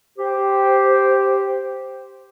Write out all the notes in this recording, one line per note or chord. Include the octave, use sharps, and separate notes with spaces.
G4 C5